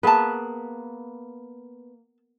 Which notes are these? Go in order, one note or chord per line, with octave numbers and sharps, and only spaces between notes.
A#3 B3 G#4 B4 A5